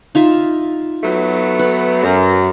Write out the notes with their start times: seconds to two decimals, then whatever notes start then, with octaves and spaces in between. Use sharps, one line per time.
0.15 D#4 F4 E5
1.02 F#3 A3 B3
1.59 B4
2.02 F#2